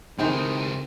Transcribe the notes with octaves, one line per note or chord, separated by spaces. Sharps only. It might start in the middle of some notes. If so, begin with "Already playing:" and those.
C#2 A2 D#3 C4 D#4 G4 G#4 G5